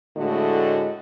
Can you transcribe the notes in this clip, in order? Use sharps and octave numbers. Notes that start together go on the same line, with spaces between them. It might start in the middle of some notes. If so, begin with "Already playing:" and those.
A2 D3 G#3 A3 F#4 D#5